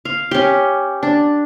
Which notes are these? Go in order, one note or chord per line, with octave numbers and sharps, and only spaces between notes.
F5
C#4 G4
D4